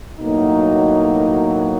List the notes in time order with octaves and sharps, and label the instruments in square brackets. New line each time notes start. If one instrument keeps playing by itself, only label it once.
[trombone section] B1 A2 F#3 A#3 D#4